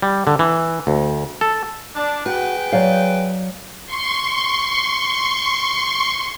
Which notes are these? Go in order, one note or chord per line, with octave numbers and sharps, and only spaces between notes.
G3
D3
E3
D2
A4
D4
F#4 G#4 B4 G5
F#3 D5 F5
C6 C#6